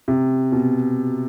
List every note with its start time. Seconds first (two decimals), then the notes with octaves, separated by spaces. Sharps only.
0.08 C3
0.52 B2